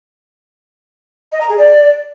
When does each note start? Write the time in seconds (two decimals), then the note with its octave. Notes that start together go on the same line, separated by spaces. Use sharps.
1.32 D#5
1.41 A#5
1.49 G#4
1.58 D5